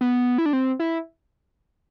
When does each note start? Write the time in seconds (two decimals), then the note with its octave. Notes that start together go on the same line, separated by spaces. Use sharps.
0.01 B3
0.38 E4
0.46 D4
0.53 C4
0.79 E4